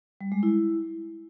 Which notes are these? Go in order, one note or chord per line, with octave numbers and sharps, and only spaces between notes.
G3
G#3
E4